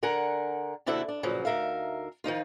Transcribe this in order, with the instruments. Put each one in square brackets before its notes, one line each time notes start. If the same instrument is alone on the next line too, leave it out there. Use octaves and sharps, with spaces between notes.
[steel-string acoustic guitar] D3 A#4 F#5 G#5 A#5
D#2 C3 D4 E4 F#4 A4
D4
G2 A#2 C#3 F3 F#3
D2 D#4 A#4 E5 F5
D#3 F3 D#4 F4